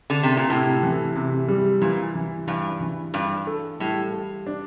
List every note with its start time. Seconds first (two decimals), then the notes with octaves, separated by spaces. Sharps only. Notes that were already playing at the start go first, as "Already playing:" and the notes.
0.10 D3
0.23 C3
0.37 A#2
0.49 A2 C3
0.83 E3
1.16 C3
1.48 G3
1.82 A#2 E3
2.15 E3
2.47 G2 E3
2.81 E3
3.14 G2 F4
3.47 A4
3.80 A2 G3
4.12 A4
4.47 D4